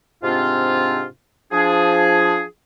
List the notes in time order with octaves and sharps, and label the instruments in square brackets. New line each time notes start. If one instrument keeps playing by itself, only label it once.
[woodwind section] G#2 C3 C4 D4 F4
F3 D4 G#4